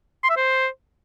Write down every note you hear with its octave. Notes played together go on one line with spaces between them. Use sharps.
C6
E5
C5